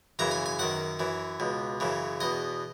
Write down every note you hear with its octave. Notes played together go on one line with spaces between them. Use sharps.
F#2 C#3 E3 A#5
G#5
G#5
F#2 D#3 F#5
F#2 E3
C#2 B2
F#2 C#3 E3
E2 B2 D#5